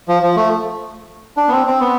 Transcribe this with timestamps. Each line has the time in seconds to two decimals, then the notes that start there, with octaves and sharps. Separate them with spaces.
0.08 F3
0.23 F3
0.36 A3
1.37 D4
1.48 B3
1.52 C4
1.67 C4
1.81 B3